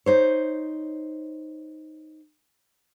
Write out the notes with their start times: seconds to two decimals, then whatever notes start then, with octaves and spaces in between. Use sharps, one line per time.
0.06 D#4 C5 C#5